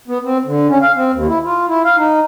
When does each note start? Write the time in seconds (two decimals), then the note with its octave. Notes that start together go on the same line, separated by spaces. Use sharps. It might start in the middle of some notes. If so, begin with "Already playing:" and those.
0.08 B3
0.24 C4
0.46 D3
0.69 C#4
0.82 F5
0.96 C4
1.14 D#2
1.28 E4
1.45 F4
1.69 E4
1.85 F5
1.97 D#4